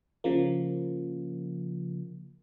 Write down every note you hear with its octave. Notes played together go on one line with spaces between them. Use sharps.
C#3 F3 A#3